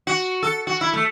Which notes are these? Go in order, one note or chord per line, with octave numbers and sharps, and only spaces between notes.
F#4
A4
F#4
E4
A3